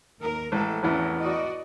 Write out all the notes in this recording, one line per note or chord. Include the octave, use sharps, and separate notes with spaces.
D#2 A#4
A1 G#3 A4
A1 E2 C4 C#4 E4
F#4 D5 D#5